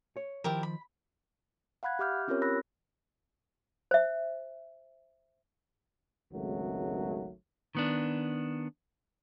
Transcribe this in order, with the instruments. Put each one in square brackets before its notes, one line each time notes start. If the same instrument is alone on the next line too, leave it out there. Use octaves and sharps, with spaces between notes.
[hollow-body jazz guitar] C#5
[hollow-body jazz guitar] D#3 F3 [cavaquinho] E4 G4 A#4
[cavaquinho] B5
[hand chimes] F5 F#5 B5 F#6 G#6
G4 E5 D6 F6 G6
C4 C#4 F4 G4 A#4 C#5
A#4 B5 E6 F#6 A#6
[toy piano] C5 E5
[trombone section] G#1 C#2 D#3 F#3 A3
[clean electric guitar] D#3 B3 D4